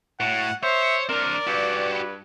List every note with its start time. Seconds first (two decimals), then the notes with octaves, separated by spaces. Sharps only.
0.20 A2 F#3 C#5 F#5 A5
0.63 C5 C#5 E5
1.09 C4 D4 A#4 D5
1.47 G2 F#4 G4
1.93 B4